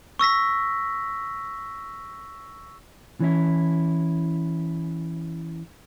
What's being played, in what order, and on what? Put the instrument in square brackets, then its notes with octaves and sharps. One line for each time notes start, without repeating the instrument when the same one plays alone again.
[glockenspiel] C#6 E6 A#6 B6
[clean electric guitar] E3 C#4 E4